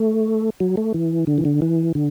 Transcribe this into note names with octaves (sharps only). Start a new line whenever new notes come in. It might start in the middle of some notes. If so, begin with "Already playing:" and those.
Already playing: A3
F#3
A3
E3
D3
E3
D3
E3
D3